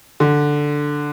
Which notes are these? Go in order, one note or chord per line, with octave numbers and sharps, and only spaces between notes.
D3